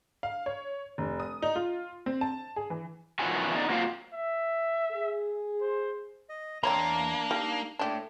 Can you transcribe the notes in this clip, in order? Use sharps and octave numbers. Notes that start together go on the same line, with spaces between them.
F5
C#5
F1
D#6
D#4
F4
C4
A5
G#4
E3
E2 B2 D#3 F3 F#3 G#5
B3 D#4 D5 D#5
F#3 A#3 C4 F4 D#5 F5
E5
G#4
C5
D#5
E2 A#3 C4 D4 C#5 A#5 B5
G3 D#4
A3 D4 G4 C#5 A5